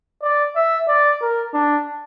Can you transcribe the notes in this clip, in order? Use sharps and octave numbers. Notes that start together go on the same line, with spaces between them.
D5
E5
D5
A#4
D4